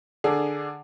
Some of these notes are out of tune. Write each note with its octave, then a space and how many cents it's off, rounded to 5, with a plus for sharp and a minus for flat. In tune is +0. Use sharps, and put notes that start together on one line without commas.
D3 +15 D4 +0 G#4 +15